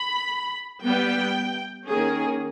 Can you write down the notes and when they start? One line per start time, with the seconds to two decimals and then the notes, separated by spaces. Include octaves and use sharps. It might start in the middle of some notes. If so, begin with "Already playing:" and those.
Already playing: B5
0.83 G3 B3 G5
1.88 D#3 A#3 C#4 G#4